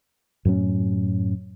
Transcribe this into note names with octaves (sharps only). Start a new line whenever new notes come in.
F#2 A2 F#3 C#4